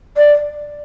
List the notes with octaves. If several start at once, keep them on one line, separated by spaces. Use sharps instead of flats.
D5